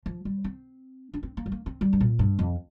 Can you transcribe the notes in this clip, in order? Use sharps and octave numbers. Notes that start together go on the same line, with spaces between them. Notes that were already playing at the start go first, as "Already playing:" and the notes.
F3
G3
C4
D4
C4
A#3
G3
A#3
C4
G3
G2
A#2
G2
F2